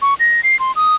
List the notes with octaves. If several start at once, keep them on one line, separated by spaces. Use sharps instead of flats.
C#6
A#6
C7
C6
D#6